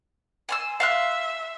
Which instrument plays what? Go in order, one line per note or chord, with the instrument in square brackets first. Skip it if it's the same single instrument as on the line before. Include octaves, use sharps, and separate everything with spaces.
[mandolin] G#5 C6 E6
[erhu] E5 [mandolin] F5 C6 F#6